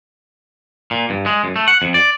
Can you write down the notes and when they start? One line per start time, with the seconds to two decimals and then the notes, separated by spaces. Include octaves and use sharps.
0.91 A#2
1.10 G2
1.26 G#3
1.44 F#2
1.56 A3
1.68 F#5
1.82 F2
1.94 D5